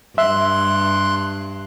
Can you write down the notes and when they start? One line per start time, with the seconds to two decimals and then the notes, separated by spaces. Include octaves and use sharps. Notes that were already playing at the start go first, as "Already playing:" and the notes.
0.18 G2 E5 C6 F#6